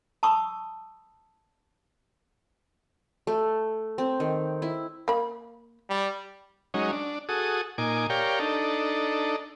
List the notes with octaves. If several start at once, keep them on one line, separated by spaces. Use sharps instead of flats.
A5 B5 C#6 D#6 E6
A3
C4
D#3
E4
A#3 B5
G3
F#3 G#3 C#4 D#4
D4
F#4 G#4 A4 D#6
A#2 D#4 G#5 D6
G4 A#4 C#5 D5 F5 G5
D4 D#4 A4